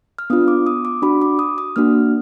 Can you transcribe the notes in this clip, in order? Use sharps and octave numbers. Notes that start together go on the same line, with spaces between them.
F6
B3 D4 F4 D#6
D6
D#6
D6
D4 F#4 B5
D6
D#6
D#6
A#3 D4 F#4 F6